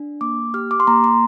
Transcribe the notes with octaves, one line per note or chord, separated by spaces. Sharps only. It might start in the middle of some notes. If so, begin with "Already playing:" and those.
Already playing: D4
A#3 D6
G4 F6
D6
C6
A#3 A#5
C6